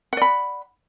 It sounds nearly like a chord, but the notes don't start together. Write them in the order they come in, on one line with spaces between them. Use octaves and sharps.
F#5 D5 B5